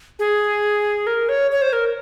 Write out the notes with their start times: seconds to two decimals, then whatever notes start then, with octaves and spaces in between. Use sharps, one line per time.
0.19 G#4
1.07 A#4
1.29 C#5
1.51 C#5
1.62 C5
1.73 A#4